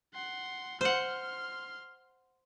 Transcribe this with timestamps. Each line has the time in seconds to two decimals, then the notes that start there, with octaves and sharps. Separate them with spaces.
0.14 F#5 C6
0.81 C5 F#5 C6 F6